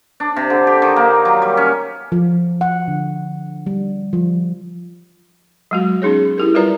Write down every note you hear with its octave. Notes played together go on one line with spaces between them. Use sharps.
D4
C3
D3
G4
D#3
A#3
F#3
G3
C#4
F3
F#5
D3
G3
F3
F#3 G#3 F#4
B3 C#4 D#4 G#4 C#5
E4 G4 A#4
G3 F4 A#4 B4 D5 A#5